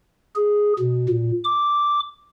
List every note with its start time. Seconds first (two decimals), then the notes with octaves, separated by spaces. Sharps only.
0.36 G#4
0.79 B2
1.09 A#2
1.44 D6